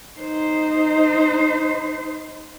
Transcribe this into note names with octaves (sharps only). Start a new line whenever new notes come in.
D#4 C5